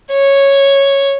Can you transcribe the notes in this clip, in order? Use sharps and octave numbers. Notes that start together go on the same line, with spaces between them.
C#5